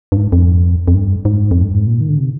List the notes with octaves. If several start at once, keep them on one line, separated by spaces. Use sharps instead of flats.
G2
G#2
F2
F2
G2
G#2
F2
G2
G#2
A#2
D#3
D3
C3